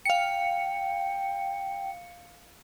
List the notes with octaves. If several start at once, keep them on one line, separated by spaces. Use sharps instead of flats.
F5 G5 C#7